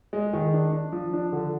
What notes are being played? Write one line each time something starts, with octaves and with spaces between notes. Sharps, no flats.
G#3
D#3
D4
D4
F3
D4
D3